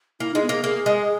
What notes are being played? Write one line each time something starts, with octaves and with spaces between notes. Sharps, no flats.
A#3 E4
G#3 D#4
B3
A#3 G#4
A#3 G#4
G#3